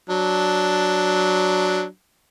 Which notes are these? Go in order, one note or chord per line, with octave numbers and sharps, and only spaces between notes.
F#3 D4